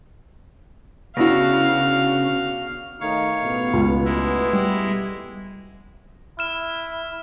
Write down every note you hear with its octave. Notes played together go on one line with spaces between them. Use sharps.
C#3 B3 D4 E4 F#4 F5 A#6
D#3 A3 D#4 C#5 F5
A1 B2 B3
C#2
G#3 E4
G3
E4 F6 E7